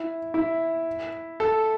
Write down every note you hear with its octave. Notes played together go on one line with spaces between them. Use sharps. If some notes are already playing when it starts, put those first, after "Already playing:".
Already playing: E4
E4
A4